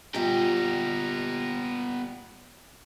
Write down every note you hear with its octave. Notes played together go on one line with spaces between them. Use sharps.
A#2 G3 B3 G4 A#5